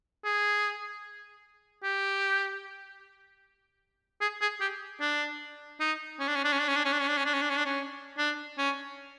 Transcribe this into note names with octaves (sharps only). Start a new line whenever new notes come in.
G#4
G4
G#4
G#4
G4
D4
D#4
C#4
D4
C#4
D4
C#4
D4
C#4
D4
C#4
D4
C#4
D4
C#4
D4
C#4
D4
C#4
D4
C#4
D4
C#4